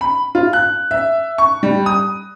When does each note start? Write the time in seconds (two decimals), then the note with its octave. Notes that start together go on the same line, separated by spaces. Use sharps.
0.01 B5
0.35 F4
0.53 F#6
0.91 E5
1.38 C#6
1.63 G3
1.86 D#6